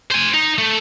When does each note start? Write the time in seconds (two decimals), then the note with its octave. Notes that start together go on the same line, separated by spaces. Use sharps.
0.11 C5 G#5
0.34 D#4
0.58 A3